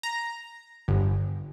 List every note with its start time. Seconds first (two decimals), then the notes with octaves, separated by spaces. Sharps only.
0.03 A#5
0.88 G1